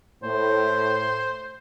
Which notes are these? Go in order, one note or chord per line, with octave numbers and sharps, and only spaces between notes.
A2 C5